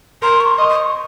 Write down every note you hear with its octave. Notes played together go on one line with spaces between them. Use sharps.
A#4 C6
C#6
D#5 C6
C6
C#6